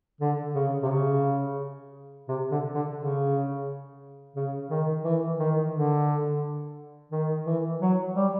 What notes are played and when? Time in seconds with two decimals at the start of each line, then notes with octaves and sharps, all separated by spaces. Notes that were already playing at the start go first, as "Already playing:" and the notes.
0.21 D3
0.55 C#3
0.83 C3
0.90 C#3
2.28 C3
2.51 D3
2.75 D3
2.97 C#3
4.36 C#3
4.70 D#3
5.04 E3
5.39 D#3
5.74 D3
7.12 D#3
7.46 E3
7.81 F#3
8.16 G3